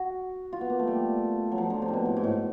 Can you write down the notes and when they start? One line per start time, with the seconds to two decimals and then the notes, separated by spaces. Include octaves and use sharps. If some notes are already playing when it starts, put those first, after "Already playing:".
Already playing: F#4
0.53 F4
0.61 B3
0.70 A#3
0.79 A3
0.87 G3
1.52 F#3
1.58 F3
1.70 D3
1.82 C3
1.88 A#2
1.93 B2
2.05 A2
2.17 G#2
2.24 A2